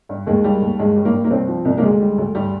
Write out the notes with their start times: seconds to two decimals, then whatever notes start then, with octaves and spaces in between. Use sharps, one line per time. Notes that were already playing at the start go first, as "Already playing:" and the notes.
0.09 G2
0.26 D#2 G#3
0.44 G3
0.62 D#2
0.79 G2 G#3
0.96 G3
1.05 A#3
1.13 G2
1.24 A#3
1.31 C2 C4
1.48 F3
1.65 C2
1.78 A#3
1.82 D2 G#3
2.01 G3
2.18 D2
2.35 G2 G3